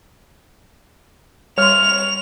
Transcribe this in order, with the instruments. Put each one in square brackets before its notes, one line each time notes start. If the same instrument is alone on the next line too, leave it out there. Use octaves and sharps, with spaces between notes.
[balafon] G3 C6 [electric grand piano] C#5 F6 [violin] F7